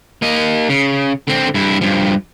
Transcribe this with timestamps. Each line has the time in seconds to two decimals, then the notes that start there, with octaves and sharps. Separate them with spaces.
0.22 A#3 D#5
0.69 C#3
1.28 D3 C4
1.54 G2 E4
1.81 G2 F3